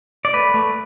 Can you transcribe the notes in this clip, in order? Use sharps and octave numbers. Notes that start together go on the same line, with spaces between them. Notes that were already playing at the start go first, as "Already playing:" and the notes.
D5
A3 B4
A3